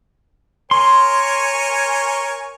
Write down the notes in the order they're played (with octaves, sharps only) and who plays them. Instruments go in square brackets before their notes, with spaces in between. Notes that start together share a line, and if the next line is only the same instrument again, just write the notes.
[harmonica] A#4 C#5 G#5 [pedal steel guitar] C6